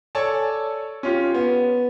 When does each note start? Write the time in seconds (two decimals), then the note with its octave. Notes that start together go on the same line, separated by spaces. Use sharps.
0.15 A4 C#5 D5 G#5 A5
1.03 C#4 F4 G4
1.34 B3